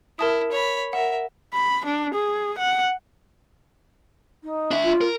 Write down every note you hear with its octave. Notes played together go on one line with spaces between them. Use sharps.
E4 A#4 A5 D#6
C#5 B5
A#4 E5 F#5
B5
D4
G#4
F#5
D#4
D4 E5
F4
A#4